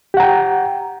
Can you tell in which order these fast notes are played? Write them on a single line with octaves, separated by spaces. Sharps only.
G4 F#5 A#5 G5